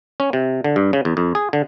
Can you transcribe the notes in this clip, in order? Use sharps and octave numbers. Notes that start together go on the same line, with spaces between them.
C#4
C3
D3
G2
C#3
E2
F2
G#4
D3